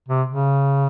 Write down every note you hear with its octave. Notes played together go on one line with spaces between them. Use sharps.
C3
C#3